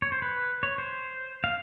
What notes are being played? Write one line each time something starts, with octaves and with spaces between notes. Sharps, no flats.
C#5
C5
B4
C#5
C5
F5